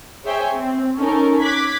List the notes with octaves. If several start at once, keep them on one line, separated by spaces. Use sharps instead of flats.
G#4 C5 C#5 E5 G5 G#5
C4
C#4 D#4 A4 A#4
D6 F#6 G#6 B6